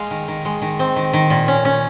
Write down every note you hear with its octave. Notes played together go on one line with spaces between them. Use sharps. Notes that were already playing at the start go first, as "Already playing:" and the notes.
Already playing: G#3 F5
D#3
D#3
G#3
D#3
C4
D#3
D#3
A#2
C#4
C#4